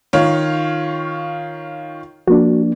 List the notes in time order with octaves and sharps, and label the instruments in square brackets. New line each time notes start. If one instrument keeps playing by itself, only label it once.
[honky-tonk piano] D#3 F4 C#5
[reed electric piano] F3 A#3 D4 [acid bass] F#4